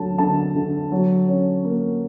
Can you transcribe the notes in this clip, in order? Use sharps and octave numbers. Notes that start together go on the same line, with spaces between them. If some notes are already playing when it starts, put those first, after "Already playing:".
Already playing: D2 F#3 A5
D3 A5
D3
F#3
C#4
A#3